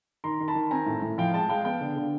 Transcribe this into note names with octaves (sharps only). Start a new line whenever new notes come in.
D#3 A#5 C6
D#3
A5 B5
D#3
C4 G#5 A#5
A2
A2
F3 F5 G5
G#3 G5 A5
G#3 F5 G5
B3 F5 G5
D3
D3